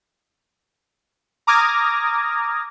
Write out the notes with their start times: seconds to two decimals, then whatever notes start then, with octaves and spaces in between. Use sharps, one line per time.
1.47 A#5 D6 D#6 F6 G#6 A#6